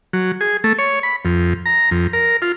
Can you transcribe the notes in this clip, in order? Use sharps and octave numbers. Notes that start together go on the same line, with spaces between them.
F#3
G#4
A3
C#5
B5
F2
A#5
F2
A#4
F4